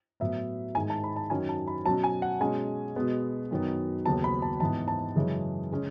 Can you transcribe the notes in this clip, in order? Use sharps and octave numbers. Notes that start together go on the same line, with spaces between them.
A2 F#3 B3 E5
G#2 D#3 G#3 G#5
A5
B5
A5
F#2 D#3 F#3 C#4 G#5
A5
B5
B2 F#3 C#4 A5
G#5
F#5
B2 G#3 C#4 G#5
B2 G#3 B3
F#2 D#3 F#3 B3
D#2 C#3 F#3 B3 A5
B5
A5
G#2 E3 B3 A5
A5
F#2 C#3 E3 G#3
C#3 G#3 C#4